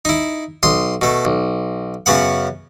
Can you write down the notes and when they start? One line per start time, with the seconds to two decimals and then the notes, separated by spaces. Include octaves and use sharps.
0.05 D#4 E4
0.63 B1 C6 D#6
1.02 B2 A3
1.25 B1
2.06 F#2 C#3 B3 F#5